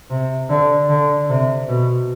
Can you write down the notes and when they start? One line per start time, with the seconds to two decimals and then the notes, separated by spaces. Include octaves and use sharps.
0.10 C3
0.49 D3
0.89 D3
1.30 C3
1.69 B2